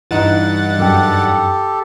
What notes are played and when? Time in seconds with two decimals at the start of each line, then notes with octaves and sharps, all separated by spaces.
0.11 G2 E3 D#4 F#5 A6
0.79 F#2 G4 A4 G5